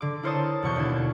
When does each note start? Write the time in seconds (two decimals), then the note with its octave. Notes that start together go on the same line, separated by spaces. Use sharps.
0.01 D3 D6
0.23 E4 A#4 C5 C#5 A5 D#6
0.63 E2 B2 C#6 G6
0.76 D#2 D3 D4 E4 G#6